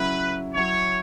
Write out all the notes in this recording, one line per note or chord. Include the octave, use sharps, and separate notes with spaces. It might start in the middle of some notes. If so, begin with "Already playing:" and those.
Already playing: C#3 F#3 E4 B4
F#3 E4 C#5